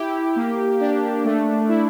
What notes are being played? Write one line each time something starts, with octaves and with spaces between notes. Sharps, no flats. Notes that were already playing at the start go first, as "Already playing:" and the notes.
Already playing: E4 G4
A#3
D4
A3
E4